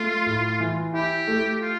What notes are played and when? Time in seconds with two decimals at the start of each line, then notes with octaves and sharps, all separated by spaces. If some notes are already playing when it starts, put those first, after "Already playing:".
Already playing: A3 F4
0.26 A2
0.60 E3
0.94 E4 G4
1.27 A3
1.61 F4